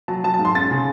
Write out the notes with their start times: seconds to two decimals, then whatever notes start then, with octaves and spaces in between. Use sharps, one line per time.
0.08 F#3 A5
0.24 F#3 A5
0.34 A5
0.39 G#2
0.45 C6
0.55 C#4 A6
0.71 C#3